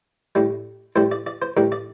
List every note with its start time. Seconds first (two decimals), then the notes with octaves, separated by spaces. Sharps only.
0.35 A2 G3
0.96 A2 G3 C5
1.11 D5
1.26 D5
1.42 C5
1.57 A2 G3 A#4
1.72 D5